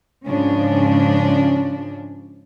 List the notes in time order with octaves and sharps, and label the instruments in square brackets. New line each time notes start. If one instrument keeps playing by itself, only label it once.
[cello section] G#2 C#3 F3 C#4 D4